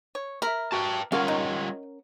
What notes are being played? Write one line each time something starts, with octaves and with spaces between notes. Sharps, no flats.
C#5
A#4 E5 B5
F#4 B4 G5 A5
G3 C#4 F4 A#4 C#5 F5 F#5
D#4